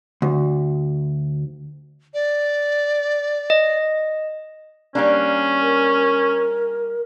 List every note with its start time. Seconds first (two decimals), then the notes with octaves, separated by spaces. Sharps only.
0.22 D2
2.14 D5
3.50 D#5
4.95 G3 A#3 C#4 D4
5.62 A#4